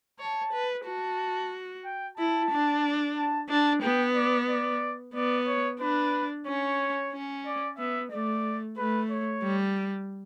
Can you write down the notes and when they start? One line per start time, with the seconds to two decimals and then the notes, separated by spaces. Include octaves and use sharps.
0.19 C#5 A5
0.52 B4
0.86 F#4 A5
1.85 G5
2.17 E4 A5
2.51 D4
3.17 A5
3.49 D4 A5
3.82 B3 G5
4.15 D5
4.49 D5
5.14 B3 D5
5.47 C#5
5.80 D4 B4
6.46 C#4 C#5
7.13 C#4
7.46 D5
7.78 B3 E5
8.11 A3 D5
8.77 A3 B4
9.10 C#5
9.43 G3